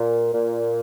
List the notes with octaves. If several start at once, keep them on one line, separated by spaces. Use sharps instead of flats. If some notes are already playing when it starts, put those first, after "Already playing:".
Already playing: A#2
A#2